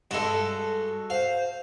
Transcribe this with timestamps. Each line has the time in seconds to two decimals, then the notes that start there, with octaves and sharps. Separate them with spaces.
0.11 G2 G#3 F#4 A4
1.10 C5 F5